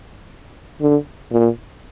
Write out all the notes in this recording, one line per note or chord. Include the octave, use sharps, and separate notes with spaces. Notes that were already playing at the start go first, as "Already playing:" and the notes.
D3
A#2